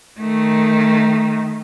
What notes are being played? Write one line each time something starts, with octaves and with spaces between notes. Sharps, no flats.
D#3 A3